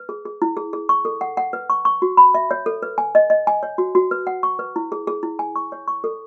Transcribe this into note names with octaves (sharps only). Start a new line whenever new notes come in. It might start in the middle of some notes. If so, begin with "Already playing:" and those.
Already playing: B4
G#4
G#4
E4
G#4
G#4
C#6
A4
F#5
F#5
B4
C#6
C#6
F#4
B5
E5
C#5
A4
B4
G#5
D#5
D#5
G#5
C#5
F#4
F#4
B4
F#5
C#6
B4
E4
G#4
G#4
E4
G#5
C#6
C#5
C#6
A4